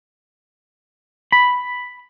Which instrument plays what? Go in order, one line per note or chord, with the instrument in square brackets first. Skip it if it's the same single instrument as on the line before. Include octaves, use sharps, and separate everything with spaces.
[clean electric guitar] B5